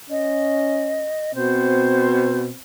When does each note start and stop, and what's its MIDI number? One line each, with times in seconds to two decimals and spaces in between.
0.10 1.11 61
0.10 1.34 75
1.34 2.51 47
1.34 2.61 60
1.34 2.41 72